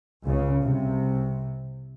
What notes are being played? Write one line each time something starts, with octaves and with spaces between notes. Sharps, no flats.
C#2 C#3
C2 C3